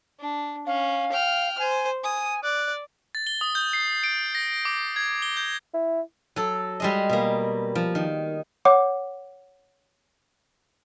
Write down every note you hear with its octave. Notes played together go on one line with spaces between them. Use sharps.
D4
C#4 F5
G5 F6
C5 G#5
G#5 D#6
D5 F#6
A6
G7
D#6
G6
C7
D7
A#6
D6
G#6
G7
G6
E4
F#3 A4
G3 G#3 D#5
B2 A#3
F3
D#3
C#5 F#5 D6